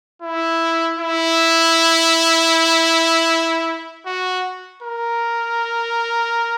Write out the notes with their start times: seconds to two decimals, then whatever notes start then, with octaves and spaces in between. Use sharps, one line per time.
0.22 E4
0.99 E4
4.06 F#4
4.83 A#4